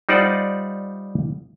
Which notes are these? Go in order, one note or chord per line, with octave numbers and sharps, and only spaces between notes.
G3 D#4 F4 C5 D5 F#5